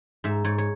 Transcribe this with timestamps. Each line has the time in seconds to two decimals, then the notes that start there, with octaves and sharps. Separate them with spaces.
0.24 G#2 E5
0.44 G#2 C#5
0.58 C#5